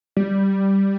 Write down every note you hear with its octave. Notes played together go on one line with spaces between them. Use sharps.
G3